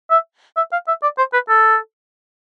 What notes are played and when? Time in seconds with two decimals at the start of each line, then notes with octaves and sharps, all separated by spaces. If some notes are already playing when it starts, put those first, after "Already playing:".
0.11 E5
0.57 E5
0.72 F5
0.88 E5
1.03 D5
1.18 C5
1.33 B4
1.49 A4